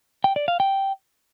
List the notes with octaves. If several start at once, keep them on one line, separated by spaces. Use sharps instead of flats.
G5
D5
F5
G5